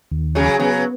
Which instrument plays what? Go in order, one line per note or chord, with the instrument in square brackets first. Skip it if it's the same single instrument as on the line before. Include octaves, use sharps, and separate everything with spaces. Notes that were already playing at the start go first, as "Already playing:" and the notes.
[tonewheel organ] D#2
[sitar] C#3 F#3 [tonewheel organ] G#4
[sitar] C#3 F#3 [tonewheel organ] B3